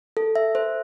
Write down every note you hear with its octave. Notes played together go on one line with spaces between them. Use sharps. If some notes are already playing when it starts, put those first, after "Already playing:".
A4
E5
C5